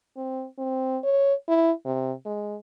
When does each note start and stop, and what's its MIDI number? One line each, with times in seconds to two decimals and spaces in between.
0.17 0.46 60
0.58 0.98 60
1.03 1.34 73
1.48 1.71 64
1.86 2.13 48
2.25 2.56 56